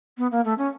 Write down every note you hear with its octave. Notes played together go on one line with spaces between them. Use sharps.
B3
A#3
A3
C#4